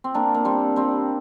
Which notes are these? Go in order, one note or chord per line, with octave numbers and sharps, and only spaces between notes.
C4
A#3 D4
A#3
G3 C4
G3 C4